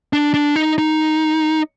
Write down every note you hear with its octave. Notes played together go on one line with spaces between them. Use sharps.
D4
D4
D#4
D#4